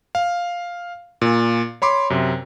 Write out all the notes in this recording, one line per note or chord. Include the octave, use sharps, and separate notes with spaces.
F5
A#2
C#5 B5 C6 D6
F#2 C3